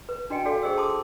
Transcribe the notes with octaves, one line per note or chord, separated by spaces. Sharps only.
B4
D4 F#4 D#5 G5 G#5
F#4 A4 D5 F5
G#4 C5 D#5 G5 C#6 E6
A5 C6 D6 D#6